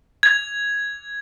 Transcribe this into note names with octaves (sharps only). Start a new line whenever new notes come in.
G#6